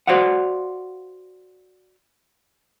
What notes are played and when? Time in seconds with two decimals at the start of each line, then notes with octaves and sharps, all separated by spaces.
0.07 F#4 C5 D5 F5 F#5